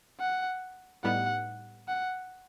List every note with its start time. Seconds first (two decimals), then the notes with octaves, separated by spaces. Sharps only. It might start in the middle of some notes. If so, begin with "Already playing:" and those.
0.20 F#5
1.04 A2 G3 B3 D#4 F#5
1.88 F#5